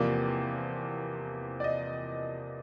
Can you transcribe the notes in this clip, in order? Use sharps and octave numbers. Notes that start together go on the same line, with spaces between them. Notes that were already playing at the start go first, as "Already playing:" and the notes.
Already playing: E2 C3 F3 A#3 D5
D5
D#5